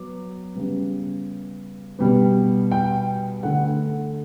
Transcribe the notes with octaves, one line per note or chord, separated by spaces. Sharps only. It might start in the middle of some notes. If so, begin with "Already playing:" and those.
Already playing: F#3 B3 D6
C#3 G3 B3
B2 G3 B3
G5
D3 A3 F#5